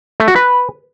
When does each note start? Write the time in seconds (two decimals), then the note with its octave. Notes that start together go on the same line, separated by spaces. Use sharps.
0.20 A3
0.28 F#4
0.36 B4